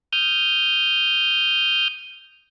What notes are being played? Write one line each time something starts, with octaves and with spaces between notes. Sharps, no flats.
D#6 F6 G6